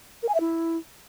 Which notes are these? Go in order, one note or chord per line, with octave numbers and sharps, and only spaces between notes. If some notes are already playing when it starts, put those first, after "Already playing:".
A#4
G#5
E5
E4